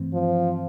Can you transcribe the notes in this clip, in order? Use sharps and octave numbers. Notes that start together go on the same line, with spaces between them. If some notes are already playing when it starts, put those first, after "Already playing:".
Already playing: G2 E3 A3 C4
F3